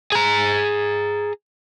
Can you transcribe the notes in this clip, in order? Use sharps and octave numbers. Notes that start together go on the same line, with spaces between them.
G#4 A#5